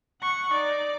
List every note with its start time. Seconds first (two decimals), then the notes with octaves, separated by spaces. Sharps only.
0.22 F#5 C#6
0.52 D#4 D5